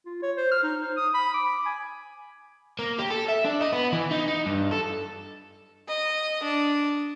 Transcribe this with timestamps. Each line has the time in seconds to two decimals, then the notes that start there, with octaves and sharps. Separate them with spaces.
0.06 F4
0.22 C#5
0.37 C5
0.51 F6
0.63 D#4
0.82 C5
0.96 D#6
1.14 B5
1.34 D6
1.66 G#5
2.79 A#3
2.98 G4
3.10 A4
3.28 E5
3.45 D4
3.61 D#5
3.73 B3
3.93 E3
4.11 D#4
4.28 D#4
4.46 G2
4.71 A4
5.88 D#5
6.43 D4